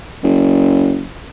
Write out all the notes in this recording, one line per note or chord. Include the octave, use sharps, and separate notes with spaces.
F#1